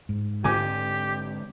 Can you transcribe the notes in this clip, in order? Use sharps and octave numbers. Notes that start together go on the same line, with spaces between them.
G#2
D3 G#3 C4 G4 G#5 D6